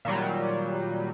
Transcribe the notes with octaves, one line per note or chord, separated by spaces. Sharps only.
A#2 D#3 F#3 G3